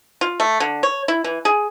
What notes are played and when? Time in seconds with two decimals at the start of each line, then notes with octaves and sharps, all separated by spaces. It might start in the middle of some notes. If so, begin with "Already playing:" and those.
0.21 F4
0.40 A3
0.60 D3
0.83 C#5
1.08 E4
1.24 E3
1.45 G#4